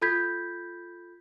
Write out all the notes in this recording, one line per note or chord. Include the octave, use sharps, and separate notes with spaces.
F4 A4 B5 G6 G#6 B6